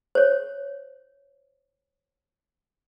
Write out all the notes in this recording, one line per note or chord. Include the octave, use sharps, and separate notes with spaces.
C5 C#5